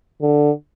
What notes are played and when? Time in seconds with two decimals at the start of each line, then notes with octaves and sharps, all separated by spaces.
0.22 D3